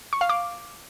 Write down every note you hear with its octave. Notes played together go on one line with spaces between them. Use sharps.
C#6
F5
D6